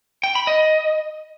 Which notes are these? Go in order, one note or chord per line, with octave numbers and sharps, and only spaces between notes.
G5
B5
D#5